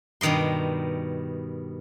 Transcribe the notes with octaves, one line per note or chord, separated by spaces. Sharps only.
G2 B2 D#3 D#5 C6